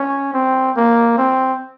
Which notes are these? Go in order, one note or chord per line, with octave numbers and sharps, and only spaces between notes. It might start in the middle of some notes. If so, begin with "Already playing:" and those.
Already playing: C#4
C4
A#3
C4